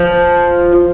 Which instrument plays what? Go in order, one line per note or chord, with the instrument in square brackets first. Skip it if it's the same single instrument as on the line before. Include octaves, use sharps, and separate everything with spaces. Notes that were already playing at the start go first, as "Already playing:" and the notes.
Already playing: [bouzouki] F3